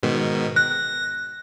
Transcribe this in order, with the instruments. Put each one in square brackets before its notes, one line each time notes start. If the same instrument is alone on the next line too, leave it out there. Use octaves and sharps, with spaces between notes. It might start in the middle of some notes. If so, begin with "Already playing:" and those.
[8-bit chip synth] G#2 B2 D#3
[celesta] F#6 [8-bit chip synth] A#6